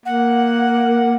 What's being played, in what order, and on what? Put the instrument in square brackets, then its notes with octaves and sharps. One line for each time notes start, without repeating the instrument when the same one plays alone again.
[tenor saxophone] A#3 [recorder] F#5